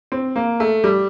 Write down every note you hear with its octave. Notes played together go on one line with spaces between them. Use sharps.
C4
A#3
A3
G3